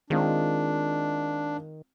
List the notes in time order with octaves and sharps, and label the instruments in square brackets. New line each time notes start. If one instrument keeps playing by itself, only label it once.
[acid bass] D#3 [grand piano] G#3 C4 F4 [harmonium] D4